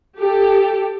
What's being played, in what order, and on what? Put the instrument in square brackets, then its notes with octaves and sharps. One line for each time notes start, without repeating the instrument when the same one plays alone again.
[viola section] G4 A4